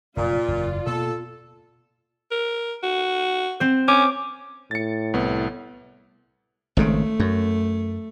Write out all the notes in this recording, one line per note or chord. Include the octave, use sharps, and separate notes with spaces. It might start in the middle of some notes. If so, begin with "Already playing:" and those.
F1 F#2 A#2 F4 D5
F#1 E2
B2 A#3 A4
A#4
F#4
C4 C5
C#4 D6
A2 A6 C#7
C2 B3
G#1 G#2 C#3 A3
F#2